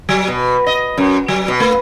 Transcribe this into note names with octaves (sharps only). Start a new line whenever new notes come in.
F#3
B2
D#5
F#2
F#3
B2
A3